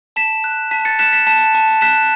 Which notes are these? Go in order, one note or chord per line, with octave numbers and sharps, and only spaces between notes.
A5 B6 E7
F#6
A5 B6
A6 C#7
F#6 B6 E7
B6 E7
A5 B6 E7
A5
F#6 B6 E7